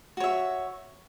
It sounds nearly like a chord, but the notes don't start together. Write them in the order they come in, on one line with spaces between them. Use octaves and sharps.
F#4 C#5 E5